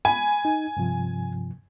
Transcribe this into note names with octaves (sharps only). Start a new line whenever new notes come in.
G#5 B5
D#4
G2 C3 F3